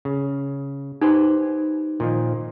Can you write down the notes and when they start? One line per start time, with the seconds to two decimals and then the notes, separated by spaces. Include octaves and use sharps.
0.05 C#3
1.02 D#4 G4 B4 C5
2.00 A#2 D#3 F3